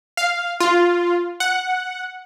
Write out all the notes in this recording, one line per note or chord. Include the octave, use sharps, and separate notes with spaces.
F5
F4
F#5